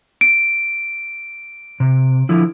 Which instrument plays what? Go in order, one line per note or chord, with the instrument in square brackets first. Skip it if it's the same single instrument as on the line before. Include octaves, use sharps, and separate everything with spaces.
[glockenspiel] D7
[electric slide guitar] C3
D3 F3 E4